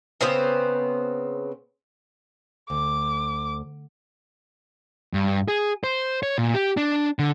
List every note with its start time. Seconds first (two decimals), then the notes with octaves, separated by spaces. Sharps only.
0.21 C#3 B3 C4 C5
2.70 D2 D6
5.14 G2
5.48 G#4
5.84 C5
6.23 C#5
6.38 A#2
6.54 G4
6.77 D4
7.19 D3